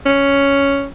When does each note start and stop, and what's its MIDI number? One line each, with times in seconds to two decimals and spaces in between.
0.06 0.87 61